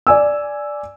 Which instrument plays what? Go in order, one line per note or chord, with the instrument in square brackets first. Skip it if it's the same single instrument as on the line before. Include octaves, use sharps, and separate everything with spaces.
[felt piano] D5 G#5 E6